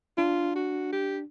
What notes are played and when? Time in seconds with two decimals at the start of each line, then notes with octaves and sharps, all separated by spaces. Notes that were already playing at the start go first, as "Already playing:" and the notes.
0.18 D4 F4
0.56 F#4
0.93 G4